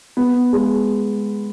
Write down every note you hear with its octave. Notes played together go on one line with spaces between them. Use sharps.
B3
G#3